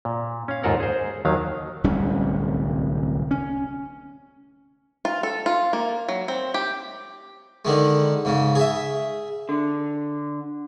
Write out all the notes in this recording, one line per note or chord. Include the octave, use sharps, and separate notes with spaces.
A#2
C#4 F5
D#2 G#2 F4 A4 A#4 F#5
G#4 C5
D#2 D#3 F#3 F5
D1 C2 G3 C#4
C#4
F4
A4
F4
A#3
F#3
C4
G4
D3 D#3 G#3
G#2 C#3
G#4 E5
D3